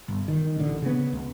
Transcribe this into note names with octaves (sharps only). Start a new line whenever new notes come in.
G1
D#3
A1 D3
C#3 B3
C#2